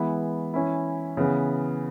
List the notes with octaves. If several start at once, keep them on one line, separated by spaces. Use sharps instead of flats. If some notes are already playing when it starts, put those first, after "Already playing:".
Already playing: E3 G#3 B3 E4
E3 C#4 E4
C#3 E3 B3